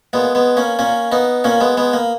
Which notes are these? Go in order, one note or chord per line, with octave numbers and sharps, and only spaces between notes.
A#2 G#3 B3
G#3 B3
A#3 C#4
A#2 A#3 C#4
B3 D#4
A#2 A#3 C#4
G#3 B3
G#3 B3
A#3